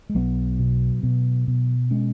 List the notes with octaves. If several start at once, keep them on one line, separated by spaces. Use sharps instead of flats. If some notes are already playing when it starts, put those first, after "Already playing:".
G#3
B1 F#3 B3
B2
B2
B2
G#3 C#4